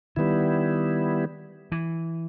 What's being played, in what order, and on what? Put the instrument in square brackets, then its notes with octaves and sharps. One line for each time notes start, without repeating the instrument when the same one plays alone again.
[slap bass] D#3 [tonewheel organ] G3 B3 E4
[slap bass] E3